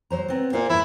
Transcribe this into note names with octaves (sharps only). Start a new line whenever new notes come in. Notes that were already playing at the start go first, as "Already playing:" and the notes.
F#3 C5 A#5
B3 C4
A#2 C5 E5 F5
G#2 F#3 E4